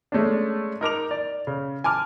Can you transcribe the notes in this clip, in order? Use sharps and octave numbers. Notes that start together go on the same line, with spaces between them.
G#3 A3 C#4 D4
D#4 A#4 D6 F7
D5
C#3
G#5 A5 D6 F6